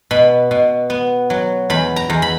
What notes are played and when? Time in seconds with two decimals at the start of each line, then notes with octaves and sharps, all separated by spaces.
0.11 B2 B5
0.51 B2
0.90 B3
1.30 F#3
1.70 E2 B5
1.96 A#5
2.10 E2
2.22 B5